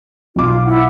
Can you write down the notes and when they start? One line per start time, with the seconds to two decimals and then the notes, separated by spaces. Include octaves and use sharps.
0.36 B1 F4 D6
0.66 E4 F#5